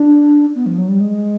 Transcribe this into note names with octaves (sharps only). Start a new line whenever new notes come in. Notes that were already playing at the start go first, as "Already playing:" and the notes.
Already playing: D4
B3
F3
F#3
G3
G#3